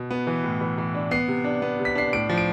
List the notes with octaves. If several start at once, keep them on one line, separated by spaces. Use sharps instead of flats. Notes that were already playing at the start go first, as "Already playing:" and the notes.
Already playing: B2
B3
E3
A2
E3
E3
D4
B3 C7
C3
D4
B3
C3
B6
D4 C7
A2 D7
F3
D7